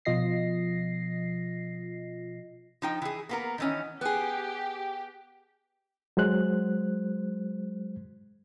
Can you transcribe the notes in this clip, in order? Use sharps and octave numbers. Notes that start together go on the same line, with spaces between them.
B2 F3 F4 D#5 A#6 C7
F3 D#4 G5
E3 G#4
A#3 B3 A#4
D#3 E3 C#4
B3 G4 G#4
F#3 G#3 C5 F#6